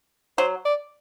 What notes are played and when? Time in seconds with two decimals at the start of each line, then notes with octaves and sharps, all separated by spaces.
0.38 F#3 C5
0.66 D5